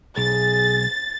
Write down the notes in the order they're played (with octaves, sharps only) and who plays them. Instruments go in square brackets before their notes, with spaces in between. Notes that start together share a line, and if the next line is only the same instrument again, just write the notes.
[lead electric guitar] B1 [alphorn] G#4 [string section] A6